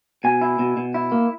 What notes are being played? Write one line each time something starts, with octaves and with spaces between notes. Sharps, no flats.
B2 G#5
E4
B2
B2
E4
A#3